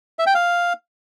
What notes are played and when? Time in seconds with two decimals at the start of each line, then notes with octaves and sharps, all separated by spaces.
0.19 E5
0.27 G5
0.34 F5